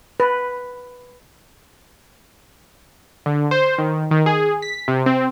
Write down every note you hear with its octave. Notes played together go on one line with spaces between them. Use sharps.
B4
D3
C5
D#3
D#3
G#4
B6
C3
C4